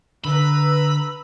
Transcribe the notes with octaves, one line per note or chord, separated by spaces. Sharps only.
D3 B4 A#5 B5 E6